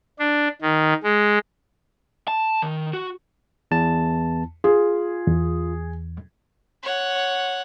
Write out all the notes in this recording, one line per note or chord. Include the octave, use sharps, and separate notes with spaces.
D4
D#3
G#3
A5
D#3
F#4
E2 A5
F4 G#4
E2
C#5 F#5